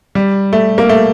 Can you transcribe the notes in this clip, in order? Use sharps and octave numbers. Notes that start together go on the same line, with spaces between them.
G3
A3
A#3
A3